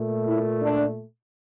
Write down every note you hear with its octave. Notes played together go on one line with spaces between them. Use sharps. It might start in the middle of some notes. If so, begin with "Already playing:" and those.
Already playing: A#2 A3
E4
D4